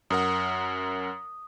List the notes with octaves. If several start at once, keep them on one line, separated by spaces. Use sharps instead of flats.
F#2 A#4 F#5 D#6